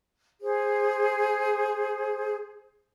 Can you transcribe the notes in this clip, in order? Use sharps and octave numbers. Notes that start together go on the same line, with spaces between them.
G#4 C5